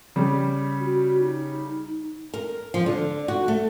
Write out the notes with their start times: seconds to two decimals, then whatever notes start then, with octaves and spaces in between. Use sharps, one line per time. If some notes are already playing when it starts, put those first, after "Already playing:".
0.16 C#3 G3
0.80 F#4
1.20 D#4
2.34 A#4
2.74 F3
2.86 D3
3.28 F#4
3.48 A3